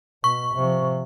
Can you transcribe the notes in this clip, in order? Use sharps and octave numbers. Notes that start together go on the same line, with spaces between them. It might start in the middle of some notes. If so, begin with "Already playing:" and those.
B2 C#6
C3 F3